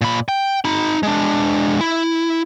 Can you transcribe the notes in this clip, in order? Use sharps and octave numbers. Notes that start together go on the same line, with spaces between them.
A#2 B5
G5
D#4 B5
G#3 D4
E4